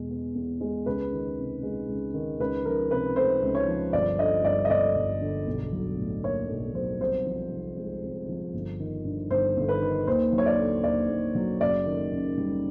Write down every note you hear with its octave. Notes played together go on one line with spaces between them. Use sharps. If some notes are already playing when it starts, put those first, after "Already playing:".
Already playing: E2 B2 G#3
B3
E2
G#3
C#2 B4
D#3
C3
G#3
C#2
D#3
C#2 B4
F3 A#4
C3 B4
A3 C5
C#2
C#5
F3
G1 D5
D3 D#5
G2 D5
D#5
G1 D5
G1
D3
B1
F#3
A2
A#3 C#5
B1
F#3 C5
C2 C5
F3
C3
G#3
C2
F3
G1
D#3
G2
G1 C5
G1
B4
D#3
D#2 C5
F#3
C#5
D5
D3
D#2 D5
D#2
F#3
F#1 D5
D#3
F#2
G3